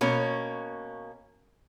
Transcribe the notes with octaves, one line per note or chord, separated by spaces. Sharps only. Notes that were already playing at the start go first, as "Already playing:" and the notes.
B2 A#3 C#4